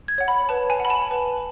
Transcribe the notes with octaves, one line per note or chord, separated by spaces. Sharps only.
G#6
C#5 F#5
B5
B4 A5
G#5
F#5 B5
A5
B4